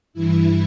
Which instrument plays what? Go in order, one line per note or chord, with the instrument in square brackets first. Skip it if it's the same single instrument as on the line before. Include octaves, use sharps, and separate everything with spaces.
[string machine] G2 E3 E4